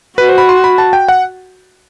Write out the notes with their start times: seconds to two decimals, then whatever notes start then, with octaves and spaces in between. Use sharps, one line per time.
0.18 F#4 B4
0.29 C5
0.38 B5
0.49 C6
0.64 B5
0.78 A5
0.93 G5
1.08 F#5